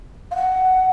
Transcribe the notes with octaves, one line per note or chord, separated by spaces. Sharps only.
F5
F#5